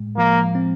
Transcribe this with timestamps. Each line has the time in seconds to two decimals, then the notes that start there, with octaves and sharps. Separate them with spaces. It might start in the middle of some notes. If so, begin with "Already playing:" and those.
Already playing: A2 G#3
0.17 F3 A#3
0.55 C4